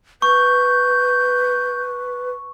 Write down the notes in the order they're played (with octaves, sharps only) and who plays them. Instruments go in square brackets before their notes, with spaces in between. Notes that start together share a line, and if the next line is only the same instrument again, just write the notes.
[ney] B4 [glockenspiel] C#6 [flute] G6